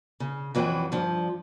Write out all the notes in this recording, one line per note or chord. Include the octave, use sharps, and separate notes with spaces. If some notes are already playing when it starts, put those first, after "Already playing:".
C#3
F2 E3 F#3 B4 G5
G2 F3